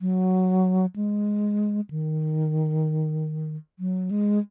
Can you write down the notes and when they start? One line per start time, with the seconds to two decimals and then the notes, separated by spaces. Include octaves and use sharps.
0.01 F#3
0.96 G#3
1.90 D#3
3.79 F#3
4.11 G#3